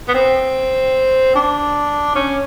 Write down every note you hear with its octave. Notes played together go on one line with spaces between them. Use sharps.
B3
C4
D4
C#4